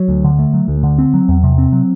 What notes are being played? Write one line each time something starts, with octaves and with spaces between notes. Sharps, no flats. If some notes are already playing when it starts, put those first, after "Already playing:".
Already playing: F#3
D2
D3
A3
F#3
D2
D3
C4
F#3
E2
C3
C4
F#3